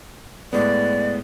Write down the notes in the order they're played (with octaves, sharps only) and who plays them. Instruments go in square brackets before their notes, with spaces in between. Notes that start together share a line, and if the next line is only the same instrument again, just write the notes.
[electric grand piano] A2 G#3 B3 [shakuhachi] D5